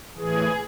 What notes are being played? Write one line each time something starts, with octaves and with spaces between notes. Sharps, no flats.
A2 E3 G#4